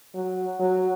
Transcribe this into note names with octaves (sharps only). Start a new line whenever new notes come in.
F#3
F#3